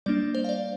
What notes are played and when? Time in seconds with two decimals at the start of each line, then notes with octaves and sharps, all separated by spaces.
0.06 G3 A#3 D4 D5
0.35 C5
0.44 F5
0.49 D5